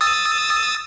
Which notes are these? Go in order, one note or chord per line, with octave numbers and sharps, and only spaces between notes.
D#6 E6 A6